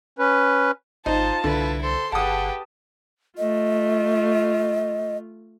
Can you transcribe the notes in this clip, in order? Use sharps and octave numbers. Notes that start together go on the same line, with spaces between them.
C#4 B4
G#1 D#4 F4 C5 A5
C2 D3 E4 B4
A4 C5 C6
G1 G4 G#4 B4 F#5 A5 D#6
A3 F4 D#5